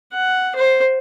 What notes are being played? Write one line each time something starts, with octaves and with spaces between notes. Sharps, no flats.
F#5
C5